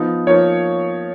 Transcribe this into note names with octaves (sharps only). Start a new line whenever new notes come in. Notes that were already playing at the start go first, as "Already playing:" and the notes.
Already playing: F3 B3 D#4
F3 A#3 D#4 C#5